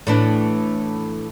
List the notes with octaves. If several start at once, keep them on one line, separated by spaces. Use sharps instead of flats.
A2 E3 D4